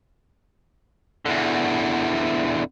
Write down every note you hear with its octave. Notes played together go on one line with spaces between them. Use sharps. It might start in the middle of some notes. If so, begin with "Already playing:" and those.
E2 D3